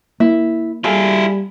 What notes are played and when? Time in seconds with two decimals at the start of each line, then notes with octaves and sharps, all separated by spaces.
0.20 A#3 E4
0.84 G3 E4 G#4 A4 F5